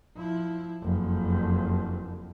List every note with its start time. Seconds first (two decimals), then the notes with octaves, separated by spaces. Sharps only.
0.17 F3 E4
0.82 F#1 F2